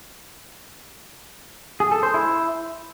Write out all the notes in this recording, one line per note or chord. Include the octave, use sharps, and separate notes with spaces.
G#4
A4
C5
E4